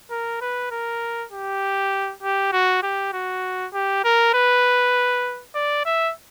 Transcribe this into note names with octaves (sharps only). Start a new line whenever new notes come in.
A#4
B4
A#4
G4
G4
F#4
G4
F#4
G4
A#4
B4
D5
E5